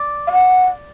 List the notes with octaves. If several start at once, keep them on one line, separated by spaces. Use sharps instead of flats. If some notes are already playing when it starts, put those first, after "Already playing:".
Already playing: D5
F5
F#5